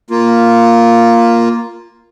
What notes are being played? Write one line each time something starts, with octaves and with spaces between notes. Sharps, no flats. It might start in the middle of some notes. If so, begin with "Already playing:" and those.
A#3 F4